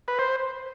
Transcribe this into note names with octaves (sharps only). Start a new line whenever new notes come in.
B4
C5